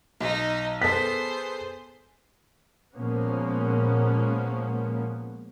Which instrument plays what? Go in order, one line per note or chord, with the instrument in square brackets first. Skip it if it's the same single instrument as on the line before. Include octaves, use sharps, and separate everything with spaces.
[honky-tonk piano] B1 [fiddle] D#4
[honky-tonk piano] B3 A4 [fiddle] G#4 C5 [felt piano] B6
[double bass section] A#2 F3 G#3 A#3 B3 C#4